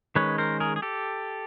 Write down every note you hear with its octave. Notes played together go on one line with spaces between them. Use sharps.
D#3 G#3 C#4 B4 C#5
A#4 C5
G#4 A#4
G#4
G4 A4